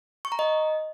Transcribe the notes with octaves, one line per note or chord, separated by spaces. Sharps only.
C#6
A#5
D#5